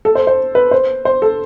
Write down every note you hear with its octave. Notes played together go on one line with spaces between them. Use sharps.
A4
C5
C5
B4
C5
C5
A4